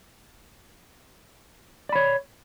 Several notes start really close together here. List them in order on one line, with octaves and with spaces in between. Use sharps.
D5 B5 C#5